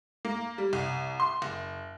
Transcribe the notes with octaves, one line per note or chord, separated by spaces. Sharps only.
A#3
G3
C2
C6
F#1